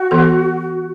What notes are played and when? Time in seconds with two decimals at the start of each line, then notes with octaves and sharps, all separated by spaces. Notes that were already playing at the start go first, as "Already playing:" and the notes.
Already playing: F#4
0.11 E3 B3 A4